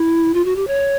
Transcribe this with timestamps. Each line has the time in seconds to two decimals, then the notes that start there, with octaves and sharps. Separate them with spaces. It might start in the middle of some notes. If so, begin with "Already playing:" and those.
Already playing: E4
0.34 F4
0.45 F#4
0.56 G4
0.67 C#5